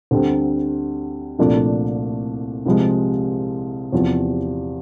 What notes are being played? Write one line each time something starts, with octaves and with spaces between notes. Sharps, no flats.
D2 D3 G3 C4
C2 A#2 F3 A3 D4
C2 C3 F3 G#3
E2 C3 F3